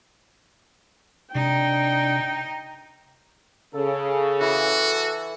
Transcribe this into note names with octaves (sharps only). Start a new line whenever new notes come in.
C3 D4 D#4 G5
C#3 A4
E3 F#4